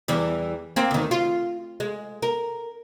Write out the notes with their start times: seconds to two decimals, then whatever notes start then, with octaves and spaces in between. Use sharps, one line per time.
0.08 E2 E3 G3
0.76 A#3 C4
0.91 D2 D#3
1.11 F4
1.80 G#3
2.22 A#4